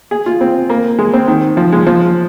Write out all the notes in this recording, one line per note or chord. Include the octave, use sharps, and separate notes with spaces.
G#4
F4
C4
A#3
G#3
C4
D#3
F3
G#3
F3